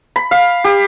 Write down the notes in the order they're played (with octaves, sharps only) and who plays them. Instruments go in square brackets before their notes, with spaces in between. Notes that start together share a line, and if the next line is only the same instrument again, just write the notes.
[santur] B5
F5
G4